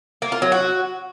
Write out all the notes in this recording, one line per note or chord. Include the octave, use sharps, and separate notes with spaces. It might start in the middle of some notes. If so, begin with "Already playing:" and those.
A#3
F4
F#3
F#4